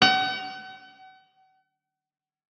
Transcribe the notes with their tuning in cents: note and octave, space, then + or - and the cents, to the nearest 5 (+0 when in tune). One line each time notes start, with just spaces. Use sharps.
F#5 +40